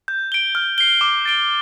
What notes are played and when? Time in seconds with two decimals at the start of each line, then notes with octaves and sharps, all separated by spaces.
0.08 G6
0.32 D7 G7
0.55 F6
0.78 C7 G7
1.01 D6
1.25 A6 D7 G7